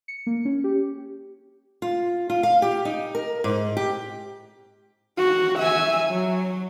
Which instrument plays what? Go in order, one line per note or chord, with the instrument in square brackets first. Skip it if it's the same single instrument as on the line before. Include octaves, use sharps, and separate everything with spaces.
[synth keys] C#7
A#3
C#4
G4
[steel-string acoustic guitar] F4
F4
F5
G4
D#4
A#4
G#2
G4
[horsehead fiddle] F#4
E5 G#5
F#3